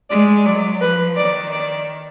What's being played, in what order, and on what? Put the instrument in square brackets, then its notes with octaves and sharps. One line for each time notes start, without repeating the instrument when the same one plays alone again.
[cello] G#3 [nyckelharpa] D5
[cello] F#3 [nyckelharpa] D5
[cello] F3 [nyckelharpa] B4
[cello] D#3 [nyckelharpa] D5
[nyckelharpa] D5